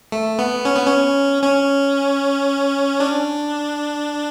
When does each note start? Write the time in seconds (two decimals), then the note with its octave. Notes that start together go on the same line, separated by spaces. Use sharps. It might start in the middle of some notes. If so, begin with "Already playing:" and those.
0.12 A3
0.39 B3
0.65 C#4
0.75 B3
0.87 C#4
1.43 C#4
3.00 D4